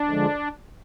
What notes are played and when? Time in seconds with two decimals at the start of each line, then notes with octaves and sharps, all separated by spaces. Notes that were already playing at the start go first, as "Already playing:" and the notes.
Already playing: D4
0.08 D3 F3 G#3